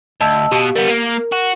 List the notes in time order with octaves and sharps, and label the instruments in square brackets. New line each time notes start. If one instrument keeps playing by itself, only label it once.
[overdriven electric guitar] D2 [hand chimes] D#5 A5 E6
[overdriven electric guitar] B2 [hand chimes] G4 F5
[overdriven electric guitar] G3 B3 [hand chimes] A#4
[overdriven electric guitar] A#3
F#4